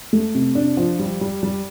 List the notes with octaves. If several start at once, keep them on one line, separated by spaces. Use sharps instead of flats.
A3
C3
D4
F3
G3
G3
G3